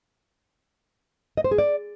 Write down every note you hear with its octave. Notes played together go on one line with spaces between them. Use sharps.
D#5
C5
G#4
D5